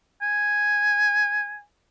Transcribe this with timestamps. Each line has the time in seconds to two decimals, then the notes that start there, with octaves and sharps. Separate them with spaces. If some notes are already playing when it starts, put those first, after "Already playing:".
0.22 G#5